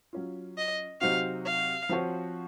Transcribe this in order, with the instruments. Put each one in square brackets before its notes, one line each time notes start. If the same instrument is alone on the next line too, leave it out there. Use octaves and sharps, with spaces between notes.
[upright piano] F#3 C#4 F4
[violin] D#5
[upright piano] C3 F#3 C4 D#4 F#4 [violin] F5
[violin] F5
[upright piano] F3 C4 F#4 C#5